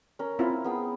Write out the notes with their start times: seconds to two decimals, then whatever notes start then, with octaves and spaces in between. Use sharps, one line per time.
0.19 C#4 A#4
0.39 C4 E4 F4
0.64 B3 G#4 G5